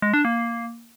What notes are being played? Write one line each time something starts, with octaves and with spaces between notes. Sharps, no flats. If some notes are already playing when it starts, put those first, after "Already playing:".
G#3
D4
A#3